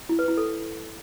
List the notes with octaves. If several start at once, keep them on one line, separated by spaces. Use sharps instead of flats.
E4
B4
E4
A4